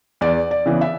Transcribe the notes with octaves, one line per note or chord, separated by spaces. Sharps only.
E2 D5
D5
C#3 E3 B3
E5